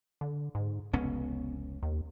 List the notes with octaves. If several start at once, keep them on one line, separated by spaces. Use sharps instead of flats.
D3
G#2
F1 C#2 B3 C#4
D#2